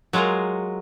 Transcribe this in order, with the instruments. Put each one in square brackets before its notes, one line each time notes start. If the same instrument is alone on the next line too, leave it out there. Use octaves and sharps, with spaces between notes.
[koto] F#3 G#3 F4 G#4 A#4